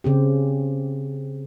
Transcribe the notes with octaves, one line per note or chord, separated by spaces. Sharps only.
C#3 C4 G4